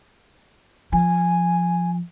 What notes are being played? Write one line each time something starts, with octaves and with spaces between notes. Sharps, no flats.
F3 G#5